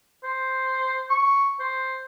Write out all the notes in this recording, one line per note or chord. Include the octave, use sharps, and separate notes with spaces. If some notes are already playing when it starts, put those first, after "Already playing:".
C5
C#6
C5